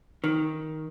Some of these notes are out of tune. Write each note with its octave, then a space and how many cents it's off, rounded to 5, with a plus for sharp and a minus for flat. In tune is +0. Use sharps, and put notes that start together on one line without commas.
D#3 +10